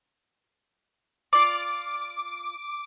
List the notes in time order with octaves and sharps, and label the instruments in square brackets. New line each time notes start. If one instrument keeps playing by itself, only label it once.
[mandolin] F4 D5 [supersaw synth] D6